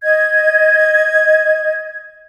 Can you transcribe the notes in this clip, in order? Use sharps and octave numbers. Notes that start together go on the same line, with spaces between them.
D#5 G#6